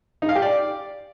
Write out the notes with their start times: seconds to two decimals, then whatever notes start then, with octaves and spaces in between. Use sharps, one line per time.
0.22 D#4
0.29 F5
0.35 G4
0.42 D5